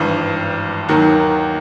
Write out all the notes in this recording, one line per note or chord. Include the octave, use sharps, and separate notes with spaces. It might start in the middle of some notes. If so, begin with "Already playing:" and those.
Already playing: G#1 G2 E3
D#2 D#3 F#3